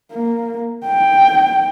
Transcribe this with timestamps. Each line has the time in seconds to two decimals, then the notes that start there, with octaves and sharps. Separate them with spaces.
0.12 A#3
0.86 G5